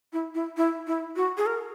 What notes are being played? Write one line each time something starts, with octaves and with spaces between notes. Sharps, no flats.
E4
E4
E4
E4
F#4
G#4
A#4